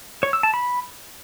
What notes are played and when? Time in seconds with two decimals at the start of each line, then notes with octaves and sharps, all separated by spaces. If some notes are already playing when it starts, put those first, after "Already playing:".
0.23 C#5
0.33 E6
0.43 A5
0.54 B5